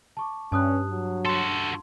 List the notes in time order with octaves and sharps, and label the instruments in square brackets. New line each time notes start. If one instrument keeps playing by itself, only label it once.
[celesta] A5 C#6 D6
[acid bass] G2 [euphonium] C#4 [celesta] A5 D#6 F#6
[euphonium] F#3
[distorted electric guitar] F#4 A4 [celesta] C6